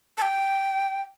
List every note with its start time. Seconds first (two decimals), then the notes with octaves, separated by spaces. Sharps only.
0.18 A5
0.22 G5